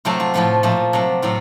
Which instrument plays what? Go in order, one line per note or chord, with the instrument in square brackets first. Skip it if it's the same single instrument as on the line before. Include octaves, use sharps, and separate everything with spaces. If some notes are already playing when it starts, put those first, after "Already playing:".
[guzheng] C3 F#3 A3 F4
F4
A2 F3 A3 F4
A#2 F3 A3
C3 F#3 A3
A2 F#3 F4